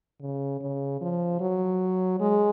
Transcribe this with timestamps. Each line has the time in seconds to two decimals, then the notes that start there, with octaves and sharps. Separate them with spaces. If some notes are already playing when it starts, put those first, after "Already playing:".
0.21 C#3
0.61 C#3
1.01 F3
1.40 F#3
2.20 G#3